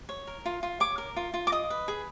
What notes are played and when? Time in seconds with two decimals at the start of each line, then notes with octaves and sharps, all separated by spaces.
0.09 C#5
0.27 A#4
0.45 F4
0.63 F4
0.80 C#5 D6
0.98 A#4
1.16 F4
1.34 F4
1.47 D6
1.52 D#5 D#6
1.70 B4
1.88 G#4